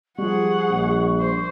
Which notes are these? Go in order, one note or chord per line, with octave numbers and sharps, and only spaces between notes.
F3 G3 G#4 F#5 C#6
A#1
C5